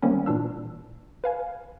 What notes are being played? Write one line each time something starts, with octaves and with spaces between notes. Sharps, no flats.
D#3 G3 A#3 C4 C#4
A#2 E3 D4 E6
B4 F5 G#5